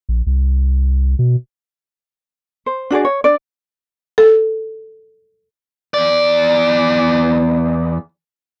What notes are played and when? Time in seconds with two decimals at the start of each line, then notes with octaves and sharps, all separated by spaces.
0.09 A#1
0.27 C2
1.19 B2
2.66 C5
2.91 D4 F#4 G#4 D5
3.05 C#5
3.24 D4 D5
4.18 A4
5.94 E2 D5